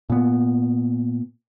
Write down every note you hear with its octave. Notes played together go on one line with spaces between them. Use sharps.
A#2 B3